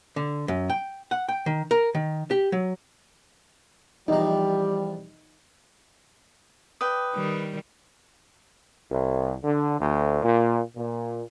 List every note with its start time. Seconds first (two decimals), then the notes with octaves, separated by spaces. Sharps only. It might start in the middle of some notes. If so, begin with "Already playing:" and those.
0.16 D3
0.48 F#2
0.70 G5
1.11 F#5
1.29 G5
1.46 D#3
1.71 A#4
1.95 D#3
2.31 G4
2.52 F#3
4.08 E2 F3 G3 D#4 G4
6.81 B4 D5 G5 D#6
7.15 D#3 G3
8.90 C2
9.44 D3
9.80 D2
10.22 A#2
10.76 A#2